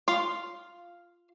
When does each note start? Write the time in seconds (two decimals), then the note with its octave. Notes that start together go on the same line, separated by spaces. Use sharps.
0.08 F4 F5